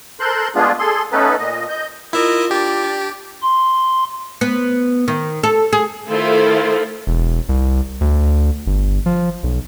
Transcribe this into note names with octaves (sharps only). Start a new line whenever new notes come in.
A4 A#4 C5 C6 F#6 G6
G#3 A3 B3 D4 F4 G#4
G#4 A4 C6
A3 B3 C#4 D#4 A4 B4
A#2 D#5
D#5 G6
E4 F4 A#4 D#5 E5
D4 G4 D5
C6
B3
D#3
A4
G#4
D#3 A3 E4 F4 A4 C5
E1
C2
D2
G1
F3
B1